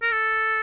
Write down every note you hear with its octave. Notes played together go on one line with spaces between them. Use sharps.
A#4
A4